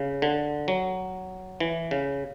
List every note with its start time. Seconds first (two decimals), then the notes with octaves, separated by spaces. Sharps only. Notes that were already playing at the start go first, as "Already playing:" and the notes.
Already playing: C#3
0.22 D3
0.68 F#3
1.60 E3
1.91 C#3